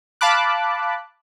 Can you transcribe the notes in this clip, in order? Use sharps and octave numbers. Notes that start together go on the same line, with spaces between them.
F5 A5 B5 D6 F#6